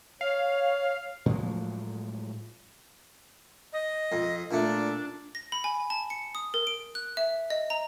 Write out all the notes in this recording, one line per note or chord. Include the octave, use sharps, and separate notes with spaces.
C#5 F5
A2 F3 F#3 G#3
D#5
F2
A#2 A3 D4
A#6
B5
G#5
A5
C#7
D#6
A#4
D7
F#6
E5
D#5
A#5